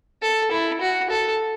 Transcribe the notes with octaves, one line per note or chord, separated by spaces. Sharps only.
A4
E4
F#4
A4